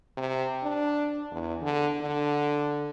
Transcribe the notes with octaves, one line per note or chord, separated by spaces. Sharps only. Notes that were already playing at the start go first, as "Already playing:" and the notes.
C3
D4
E2
D3
D3